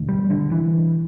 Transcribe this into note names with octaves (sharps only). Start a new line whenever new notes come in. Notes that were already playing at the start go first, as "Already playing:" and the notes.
Already playing: E1 D2 D3
G3
D3
E3